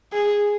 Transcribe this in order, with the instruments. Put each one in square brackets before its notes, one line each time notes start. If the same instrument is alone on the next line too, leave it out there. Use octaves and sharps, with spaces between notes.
[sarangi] G#4